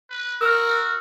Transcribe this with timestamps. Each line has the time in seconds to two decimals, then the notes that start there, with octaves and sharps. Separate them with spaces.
0.10 B4
0.41 F#4 A#4 E6 F6